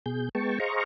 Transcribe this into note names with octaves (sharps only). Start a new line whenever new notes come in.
B2 G#4 G6
G#3 B3 G5 A5 C#6
G#4 C5 D#5 F5 A#5 C#6